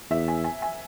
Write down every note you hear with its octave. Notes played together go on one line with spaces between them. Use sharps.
E2 E5
G#5
G#5
G#5